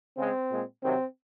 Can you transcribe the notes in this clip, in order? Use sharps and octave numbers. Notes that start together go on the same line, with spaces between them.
C#3 G#3 C4
A#2 G#3
C3 D#3 F#3 C4